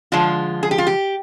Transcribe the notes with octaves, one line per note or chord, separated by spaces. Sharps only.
D3 F3 G#3 F4
G#4
G4
F4
G4